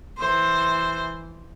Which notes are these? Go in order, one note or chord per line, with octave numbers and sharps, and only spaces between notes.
E3 C5